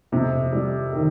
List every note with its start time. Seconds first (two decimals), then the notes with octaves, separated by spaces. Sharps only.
0.12 F2 C3
0.53 G3
0.93 D#3